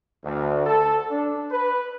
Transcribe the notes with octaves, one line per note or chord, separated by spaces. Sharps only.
D2
A4
D4
B4